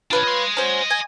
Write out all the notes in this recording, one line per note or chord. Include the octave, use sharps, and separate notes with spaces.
B1 D4 F4 B4 C#5
D#5 C6
C#4 F#4 C5
G#5